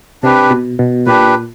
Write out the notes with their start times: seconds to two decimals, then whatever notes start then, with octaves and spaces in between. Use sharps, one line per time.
0.23 C3 D4 G4 B4
0.51 B2
0.79 B2
1.06 A#2 D4 G4 B4